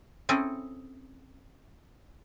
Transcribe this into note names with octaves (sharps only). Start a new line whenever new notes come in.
C4 C#4 E4 G#4 A4